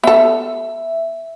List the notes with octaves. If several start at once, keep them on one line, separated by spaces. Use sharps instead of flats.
B3 A4 E5